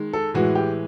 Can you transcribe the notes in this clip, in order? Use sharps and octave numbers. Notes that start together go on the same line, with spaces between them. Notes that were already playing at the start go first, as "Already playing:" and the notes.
Already playing: D#3 G#3
A4
A2 E3 G#3 F#4
G4